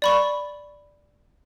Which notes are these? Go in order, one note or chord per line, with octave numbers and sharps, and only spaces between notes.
D5 B5 C#6